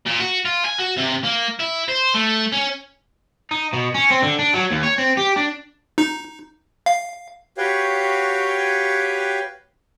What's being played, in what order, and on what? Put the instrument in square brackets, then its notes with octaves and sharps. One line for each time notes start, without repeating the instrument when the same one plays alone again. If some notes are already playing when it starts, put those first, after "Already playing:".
[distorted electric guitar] A#2
F#4
F4
G#5
F#4
C3
A#3
E4
C5
A3
C#4
[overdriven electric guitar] D#4
B2
C#4
C4
D3
D4
F#3
D#2
C#5
C4
G4
D4
[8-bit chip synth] D#4
F5
[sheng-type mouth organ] F#4 G4 B4 C#5 F5 G5